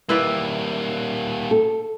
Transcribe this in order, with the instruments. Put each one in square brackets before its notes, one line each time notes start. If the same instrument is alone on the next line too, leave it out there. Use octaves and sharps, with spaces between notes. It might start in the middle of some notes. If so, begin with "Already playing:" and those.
[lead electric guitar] G3 A#3 [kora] E4 B4 D5
[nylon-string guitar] A4